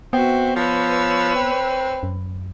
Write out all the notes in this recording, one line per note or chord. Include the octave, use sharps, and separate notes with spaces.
B3 C4 F#4 E5
F3 B4 C#5 E6
C4
F#2